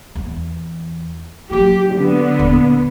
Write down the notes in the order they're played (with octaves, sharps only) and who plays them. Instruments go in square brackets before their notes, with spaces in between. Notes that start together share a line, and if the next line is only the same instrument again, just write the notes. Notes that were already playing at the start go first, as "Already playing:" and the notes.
[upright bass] E2
[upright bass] F#3 A#3 [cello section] G4
[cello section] D3 B3
[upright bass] D#1